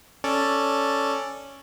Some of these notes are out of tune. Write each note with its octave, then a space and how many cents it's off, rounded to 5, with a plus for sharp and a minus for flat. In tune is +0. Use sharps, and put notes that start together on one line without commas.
C#4 +0 A4 +0 D5 +0